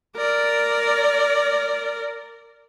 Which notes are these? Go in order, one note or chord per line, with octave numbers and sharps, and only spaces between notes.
A#4 D5